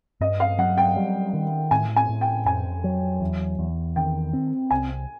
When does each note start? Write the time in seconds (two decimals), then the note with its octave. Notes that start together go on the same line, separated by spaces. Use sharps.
0.21 G2 D#5
0.40 F5
0.58 F#3 F#5
0.78 G5
0.96 G3
1.34 D#3
1.71 A2 G#5
1.96 G#5
2.09 A2
2.21 G5
2.46 F2 G#5
2.84 F#3
3.21 E2
3.59 E2
3.96 D#3 G5
4.33 C4
4.71 C2 G#5